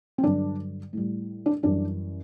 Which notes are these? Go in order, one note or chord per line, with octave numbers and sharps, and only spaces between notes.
C4
G2 D3 F#3 D4
A2 G3
D4
F#2 E3 G3 D4